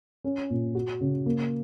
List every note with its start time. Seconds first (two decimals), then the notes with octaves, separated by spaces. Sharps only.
0.24 C#4
0.50 A#2
0.75 F#4
1.01 C#3
1.26 A#3